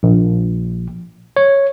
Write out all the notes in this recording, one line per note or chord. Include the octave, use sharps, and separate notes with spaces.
A#1
C#5